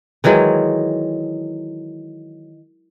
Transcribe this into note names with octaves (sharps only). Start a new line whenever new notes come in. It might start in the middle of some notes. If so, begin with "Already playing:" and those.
D#3 E3 F#3 G#3